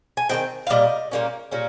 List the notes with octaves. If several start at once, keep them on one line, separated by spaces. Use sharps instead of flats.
G#5
D#3 G#3 C4 G5
F5
A#2 G3 A#3 D#5
A#2 G3 A#3 C#4
A#2 G3 A#3 C#4